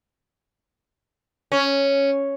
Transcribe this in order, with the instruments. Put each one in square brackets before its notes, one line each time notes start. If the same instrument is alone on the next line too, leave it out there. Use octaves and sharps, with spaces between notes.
[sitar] C#4